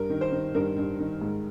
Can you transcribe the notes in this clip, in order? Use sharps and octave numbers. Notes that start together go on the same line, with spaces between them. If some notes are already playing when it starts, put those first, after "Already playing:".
Already playing: G2 A#4
D#3
C5
D#3
G2 A#4
G2
D#3
G#2